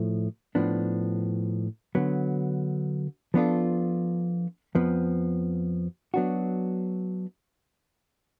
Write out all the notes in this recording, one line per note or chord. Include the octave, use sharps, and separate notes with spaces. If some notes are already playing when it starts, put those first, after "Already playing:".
Already playing: A2 F3 A3
A2 F3 B3 D4
D3 F#3 B3
F3 B3 D4 F4 A4
F2 F3 B3
F#3 B3 D4 F#4